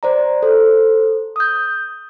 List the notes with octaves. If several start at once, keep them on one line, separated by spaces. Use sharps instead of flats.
C5 D5 A#5
A4 C5
D#6 G6